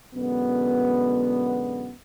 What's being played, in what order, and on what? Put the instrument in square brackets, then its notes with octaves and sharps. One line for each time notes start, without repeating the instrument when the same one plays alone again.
[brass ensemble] F#2 B2 D3 G#3 B3